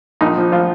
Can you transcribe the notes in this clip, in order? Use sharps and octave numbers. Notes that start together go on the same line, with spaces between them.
A#1 D#4
F3
F3 F4